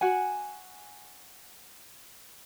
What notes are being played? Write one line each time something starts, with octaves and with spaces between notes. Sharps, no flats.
F#4 F#5 G#5